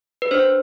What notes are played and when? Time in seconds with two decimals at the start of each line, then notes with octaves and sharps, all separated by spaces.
0.22 B4
0.31 D4 C5